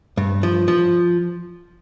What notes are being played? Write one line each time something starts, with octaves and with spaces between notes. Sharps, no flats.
G2
F3
F3